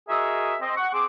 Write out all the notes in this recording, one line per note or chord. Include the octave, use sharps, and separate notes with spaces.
F#4 G#4 A#4 D#5 E5
C4 D#5
F#5 C#6
C4 G#4 D6